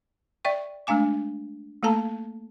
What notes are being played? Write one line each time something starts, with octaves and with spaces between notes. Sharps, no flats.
D5 E5 G5 C#6
G#3 A3 D4 F5 G#5 D6
A3 A#3 A4 A5 A#5